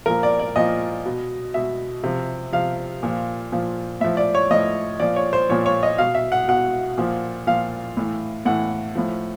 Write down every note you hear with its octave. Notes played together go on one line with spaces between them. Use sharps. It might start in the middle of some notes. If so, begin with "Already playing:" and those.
A#2 F3 A#4
D5
D5
A#2 F3 D#5
B2
B2 E5
C3 F3
C3 F3 F5
A#2 F3
A#2 F3
A2 F3 E5
D5
C#5
A2 F3 D#5
A#2 F3 D5
C#5
C5
A#2 F3 C#5
C#5
D#5
B2 F5
E5
F#5
B2 F#5
A#2 F3
A#2 F3 F5
A2 E3
A2 E3 F#5
A2 F3